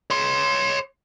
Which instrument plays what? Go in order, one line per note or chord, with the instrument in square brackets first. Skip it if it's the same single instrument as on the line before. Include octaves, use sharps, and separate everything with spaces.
[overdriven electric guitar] C#5 C6